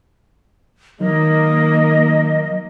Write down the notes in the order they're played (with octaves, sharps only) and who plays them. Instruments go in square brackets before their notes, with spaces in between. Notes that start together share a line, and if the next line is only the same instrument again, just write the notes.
[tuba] D#3 [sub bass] F#3 [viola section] A#3 [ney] D#5